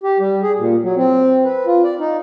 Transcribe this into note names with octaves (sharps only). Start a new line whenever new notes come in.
G4
G3
G#4
A#2
F#3
C4
B4
F4
D5
D#4